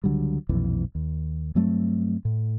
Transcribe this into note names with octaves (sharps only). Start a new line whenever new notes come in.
C#2 D3 F#3 G3
B1 F2 A#2 E3
D#2
G2 F#3 A3 C4
A2